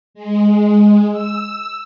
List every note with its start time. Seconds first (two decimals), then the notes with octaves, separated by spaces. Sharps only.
0.14 G#3
1.12 E6